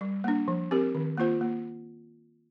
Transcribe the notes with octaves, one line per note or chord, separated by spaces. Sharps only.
G3
A#3 D4
F3
C4 G4 A#4
D#3
A#3 F4 C5
A#3